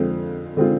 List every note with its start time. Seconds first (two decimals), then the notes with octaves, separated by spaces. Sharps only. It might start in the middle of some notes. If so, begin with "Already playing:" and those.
Already playing: F2 D3 G#3 C4 F4
0.57 D3 G#3 C4 F4